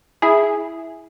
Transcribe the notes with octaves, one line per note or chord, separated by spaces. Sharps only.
E4 G#4